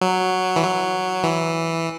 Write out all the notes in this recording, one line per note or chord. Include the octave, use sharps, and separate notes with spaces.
F#3
E3
F#3
E3